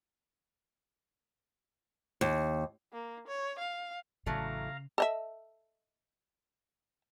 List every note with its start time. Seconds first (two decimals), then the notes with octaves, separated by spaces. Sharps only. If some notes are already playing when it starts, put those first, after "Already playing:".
2.21 D#2
2.93 A#3
3.27 C#5
3.59 F5
4.26 A1 C#3 E3 F#3 A3 F5 A#5
4.98 A4 D#5 E5